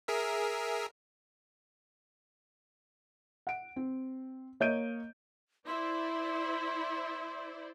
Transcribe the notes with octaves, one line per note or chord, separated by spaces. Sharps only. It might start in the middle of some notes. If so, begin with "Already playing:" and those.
G#4 A#4 E5
F#5 D7
C4
A#3 C#5 D#5 G6 D7 D#7
E4 C5 D5 C6